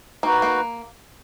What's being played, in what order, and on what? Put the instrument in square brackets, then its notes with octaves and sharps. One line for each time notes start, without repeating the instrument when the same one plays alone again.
[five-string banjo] A#3 [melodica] D#4 F#4 B4
[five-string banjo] A#3